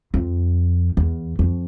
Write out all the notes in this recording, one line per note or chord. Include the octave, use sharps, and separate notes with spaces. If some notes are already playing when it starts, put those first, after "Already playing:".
F2
E2
F2